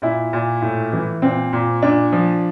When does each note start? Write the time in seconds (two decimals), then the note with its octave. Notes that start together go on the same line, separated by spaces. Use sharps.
0.02 A#2 E4
0.33 A#2
0.62 A2
0.93 E3
1.22 A#2 C4
1.53 A#2
1.82 A#2 D4
2.13 F3